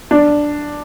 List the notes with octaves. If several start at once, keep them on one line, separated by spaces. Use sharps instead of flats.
D4